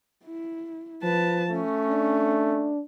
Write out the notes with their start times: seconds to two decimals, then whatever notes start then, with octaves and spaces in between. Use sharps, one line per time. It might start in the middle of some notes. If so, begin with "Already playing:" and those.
0.25 E4
1.03 F3 B4 A5
1.51 A3 C#4
1.89 D4